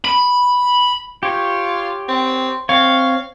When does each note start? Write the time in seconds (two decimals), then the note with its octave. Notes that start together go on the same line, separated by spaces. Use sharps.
0.04 B5
1.23 F4 G4 C#5
2.08 C4
2.69 C4 C#5 F5